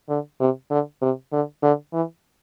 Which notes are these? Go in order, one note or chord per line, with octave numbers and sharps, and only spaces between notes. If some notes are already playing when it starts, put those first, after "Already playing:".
D3
C3
D3
C3
D3
D3
E3